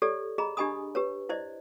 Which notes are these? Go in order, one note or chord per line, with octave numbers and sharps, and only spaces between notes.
G4 A4 C#5 D5
G#4 D#5 A#5 B5
D4 G4 D#5 G#5 B5 D#6
G4 B4 C#5
E4 C5 D5 D#5